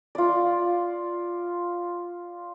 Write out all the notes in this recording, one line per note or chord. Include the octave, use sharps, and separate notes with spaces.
F4 D5